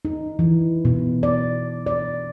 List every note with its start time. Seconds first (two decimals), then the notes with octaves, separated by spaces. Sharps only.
0.05 D#4
0.39 E3
0.85 B2
1.23 D5
1.87 D5